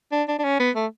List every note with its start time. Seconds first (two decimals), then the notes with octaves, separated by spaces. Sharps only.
0.12 D4
0.28 D4
0.39 D4
0.44 C#4
0.60 B3
0.76 A3